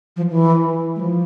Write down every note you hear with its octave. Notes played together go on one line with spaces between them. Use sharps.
F3
E3
G#3
F3